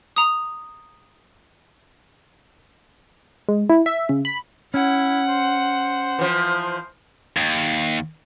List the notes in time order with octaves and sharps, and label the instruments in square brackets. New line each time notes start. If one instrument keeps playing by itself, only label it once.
[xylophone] A#5 D#6
[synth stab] G#3
E4
E5
C#3
B5
[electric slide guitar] C#4 [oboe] E4 [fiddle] F#5
[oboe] C5
[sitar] E3 F3
[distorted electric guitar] D#2